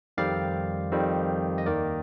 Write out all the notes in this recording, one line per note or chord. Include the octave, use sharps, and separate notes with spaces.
F2 D#3 G3 C4 D5 F5
F2 D#3 G3 C4
D#5
D#2 D#3 A#3 A#4 D5